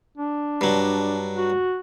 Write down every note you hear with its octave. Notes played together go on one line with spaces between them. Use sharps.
D4
G2 F#3
F#4